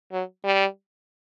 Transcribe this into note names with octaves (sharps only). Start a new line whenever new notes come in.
F#3
G3